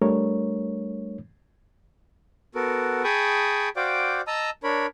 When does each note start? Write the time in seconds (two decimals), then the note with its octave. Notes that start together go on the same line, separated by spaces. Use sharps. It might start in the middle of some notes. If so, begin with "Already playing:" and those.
0.01 G3 A3 D4 A#4 C#5
2.55 B3 F#4 A4 A#4
3.04 G#4 G5 A5 B5 C#6 D#6
3.76 F#4 C5 D5 F5 G5 D6
4.27 D#5 A5 A#5 D#6 E6
4.63 D4 A#4 C#5 B5